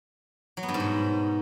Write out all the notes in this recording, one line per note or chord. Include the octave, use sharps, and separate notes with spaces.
F#3
B3
G2
G#2
B2